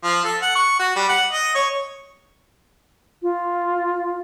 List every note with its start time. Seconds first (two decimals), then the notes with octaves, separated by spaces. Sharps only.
0.04 F3
0.24 A4
0.42 F#5
0.55 C#6
0.79 F#4
0.96 G3
1.09 F#5
1.32 D#5
1.55 C#5
3.23 F4